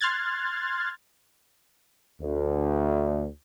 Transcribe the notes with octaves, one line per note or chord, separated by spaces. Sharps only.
C6 F6 F#6 G#6 A6
D2